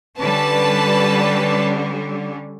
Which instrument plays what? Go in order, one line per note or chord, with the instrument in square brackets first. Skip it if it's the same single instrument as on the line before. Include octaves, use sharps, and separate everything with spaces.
[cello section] D3 G3 C#4 [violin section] B4 A5